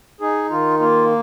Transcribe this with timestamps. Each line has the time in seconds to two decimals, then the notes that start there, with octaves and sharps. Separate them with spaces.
0.20 D#4 G#4
0.50 D#3 F4
0.79 A#3 F4